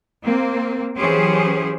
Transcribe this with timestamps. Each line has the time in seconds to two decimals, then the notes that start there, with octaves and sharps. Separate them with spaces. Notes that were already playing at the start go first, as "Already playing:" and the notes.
0.23 A#3 C4
0.96 E3 F#3 C#4 G4 G#4 C5